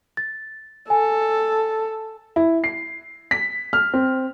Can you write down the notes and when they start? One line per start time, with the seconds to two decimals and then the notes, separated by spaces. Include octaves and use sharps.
0.17 A6
0.90 A4 G#5
2.36 E4
2.64 C7
3.31 B6
3.73 F6
3.93 C4